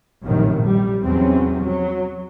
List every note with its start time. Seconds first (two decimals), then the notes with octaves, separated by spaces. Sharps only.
0.23 A#1 F#2 A2 C3 D#3
0.66 G3
1.02 E2 G#2 C3 F#3 C4 C#4
1.62 F#3